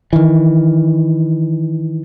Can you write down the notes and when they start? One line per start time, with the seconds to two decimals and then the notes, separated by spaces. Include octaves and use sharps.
0.13 D#3 E3